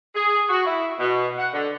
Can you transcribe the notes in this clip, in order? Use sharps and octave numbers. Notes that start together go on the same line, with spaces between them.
G#4
F#4
E4
B2
F#5
D3